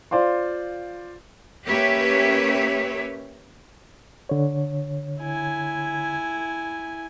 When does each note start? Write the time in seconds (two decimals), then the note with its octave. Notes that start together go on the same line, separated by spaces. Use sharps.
0.11 F4 C5 D5 F5 C6
1.68 A#3 C#4 G4 B4 C#5 E5
4.29 D3 C#5
5.20 E4 G#5